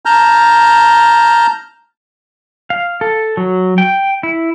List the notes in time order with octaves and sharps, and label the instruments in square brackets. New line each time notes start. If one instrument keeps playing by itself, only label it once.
[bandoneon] A5 A#5 F6 G6
[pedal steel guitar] F5
A4
F#3
G5
E4